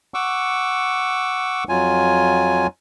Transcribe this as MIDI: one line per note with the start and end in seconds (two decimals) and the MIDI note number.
0.14 1.64 78
0.14 1.64 85
0.14 1.64 86
0.14 1.64 88
1.69 2.67 41
1.69 2.67 54
1.69 2.67 65
1.69 2.67 80